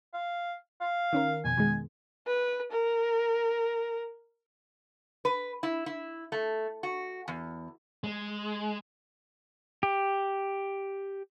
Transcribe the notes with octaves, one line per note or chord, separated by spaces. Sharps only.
F5
F5
D#3 C#4 A#4
F2 B2 G#5
B2 D#3 G#3
B4
A#4
B4
E4
E4
A3
F#4
E2
G#3
G4